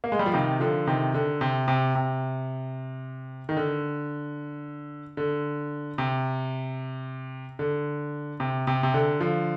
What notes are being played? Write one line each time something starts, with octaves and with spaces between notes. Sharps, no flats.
A#3
G#3
G3
F3
C3 D#3
D3 F3
C3 D#3
D3
C3
C3
C3
D#3
D3
D3
C3
D3
C3
C3
C3
D3
D3 F3